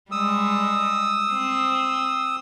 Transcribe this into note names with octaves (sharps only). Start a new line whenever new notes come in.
G3 G#3 D#6 E6
C4